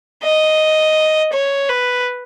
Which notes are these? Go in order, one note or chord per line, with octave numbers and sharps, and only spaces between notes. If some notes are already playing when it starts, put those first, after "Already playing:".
D#5
C#5
B4